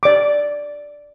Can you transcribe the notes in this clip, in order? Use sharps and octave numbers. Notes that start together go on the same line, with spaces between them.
D5 D6